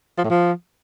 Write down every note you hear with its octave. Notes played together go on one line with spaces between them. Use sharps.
F3
A2
F3